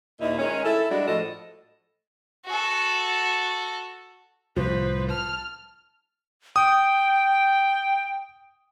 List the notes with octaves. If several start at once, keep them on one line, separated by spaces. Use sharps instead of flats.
D#2 A#2 D#4 E4
D#3 G#3 C#4
E4 A4
G3 G#3 D4 F#4
A2 F3 A4 D#5
F#4 A4
C2 A2 F3 B4 C5
A5 F6
G5 D#6